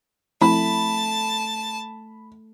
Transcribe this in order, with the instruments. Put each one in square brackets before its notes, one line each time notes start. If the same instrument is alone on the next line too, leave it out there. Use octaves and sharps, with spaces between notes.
[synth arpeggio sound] F3 C4 E4 [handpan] A3 [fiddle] A5 [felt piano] B5